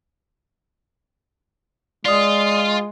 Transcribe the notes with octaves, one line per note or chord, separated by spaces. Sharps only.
G#3 F4 D5 D#6